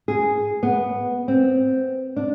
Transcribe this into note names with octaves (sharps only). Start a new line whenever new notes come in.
G#4
B3
C4
D4